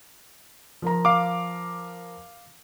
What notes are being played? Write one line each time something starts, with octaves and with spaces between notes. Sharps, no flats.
F3 A#4 A#5
F5 D6